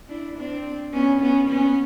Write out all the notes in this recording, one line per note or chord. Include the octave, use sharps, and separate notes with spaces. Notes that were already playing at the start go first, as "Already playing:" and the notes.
D4 E4
C4 D4
B3 C#4
B3 C#4
B3 C#4